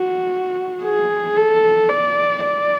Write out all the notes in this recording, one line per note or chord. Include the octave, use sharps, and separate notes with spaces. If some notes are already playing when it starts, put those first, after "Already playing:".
Already playing: F#4
G#4
A4
D5
D5